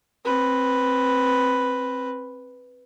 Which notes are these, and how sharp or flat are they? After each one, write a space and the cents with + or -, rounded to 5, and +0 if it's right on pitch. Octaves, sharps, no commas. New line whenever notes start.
C4 +20 B4 +0